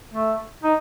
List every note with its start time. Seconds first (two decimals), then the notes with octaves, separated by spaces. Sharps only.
0.14 A3
0.64 D#4